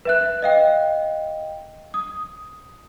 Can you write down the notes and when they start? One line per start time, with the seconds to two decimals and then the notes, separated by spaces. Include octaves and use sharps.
0.05 B4 E5 F#6
0.42 D#5 F5 G5
1.94 D#6